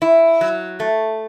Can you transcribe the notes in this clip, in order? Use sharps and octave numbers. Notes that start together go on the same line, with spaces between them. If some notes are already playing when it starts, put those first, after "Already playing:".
E4
F#3
A3